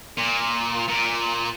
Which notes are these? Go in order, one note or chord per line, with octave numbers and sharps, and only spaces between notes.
A#2
A#2